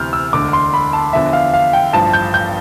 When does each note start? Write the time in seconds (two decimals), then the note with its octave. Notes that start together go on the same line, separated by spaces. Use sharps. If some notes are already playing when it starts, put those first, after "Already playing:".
Already playing: D2 C3 E3 F6 G6
0.13 E6
0.33 E1 D2 D3 D6
0.53 C6
0.74 B5
0.93 A5
1.13 E2 D3 F3 E5
1.33 F5
1.54 F5
1.73 G5
1.93 A1 G2 F3 A5
2.13 G6
2.34 G6